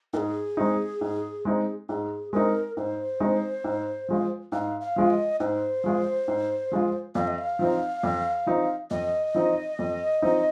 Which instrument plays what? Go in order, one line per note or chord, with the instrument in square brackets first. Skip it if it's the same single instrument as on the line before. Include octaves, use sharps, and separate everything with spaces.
[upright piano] G#2 [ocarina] A#4
[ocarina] G#4
[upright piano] G#3 C4 D#4
G#2
G#3 C4 D#4
[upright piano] G#2 [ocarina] G#4
[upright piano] G#3 C4 D#4 [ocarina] A#4
[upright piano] G#2 [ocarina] C5
[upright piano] G#3 C4 D#4
G#2
F3 G#3 F4
[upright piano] G#2 [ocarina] F5
[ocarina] F5
[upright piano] F3 G#3 F4
[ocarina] D#5
[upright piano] G#2 [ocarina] C5
[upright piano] F3 G#3 F4
G#2
F3 G#3 F4
[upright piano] F2 [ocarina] F5
[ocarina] D#5
F5
[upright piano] F3 C4 D#4
F2
F3 C4 D#4
[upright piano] F2 [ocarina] D#5
[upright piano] F3 C4 D#4
F2
F3 C4 D#4